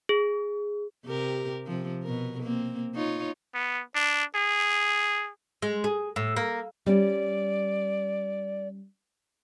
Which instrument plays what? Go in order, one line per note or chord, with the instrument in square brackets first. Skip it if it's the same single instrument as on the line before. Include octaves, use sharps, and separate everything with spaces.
[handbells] G#4
[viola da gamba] C3 G4 A#4
C3 F3
B2 A#4
A#3 C4
D#4 F4 C#5
[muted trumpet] B3
D4
G#4
[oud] G#3
G#4
A2
A#3
[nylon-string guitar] G3 C#4 [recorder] D5